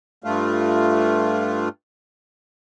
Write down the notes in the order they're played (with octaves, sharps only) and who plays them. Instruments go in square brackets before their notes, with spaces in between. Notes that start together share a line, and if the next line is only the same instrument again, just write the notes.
[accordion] G2 A3 F4